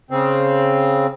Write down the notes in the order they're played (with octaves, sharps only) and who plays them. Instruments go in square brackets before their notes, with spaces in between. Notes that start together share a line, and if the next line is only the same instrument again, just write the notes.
[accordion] C#3 C4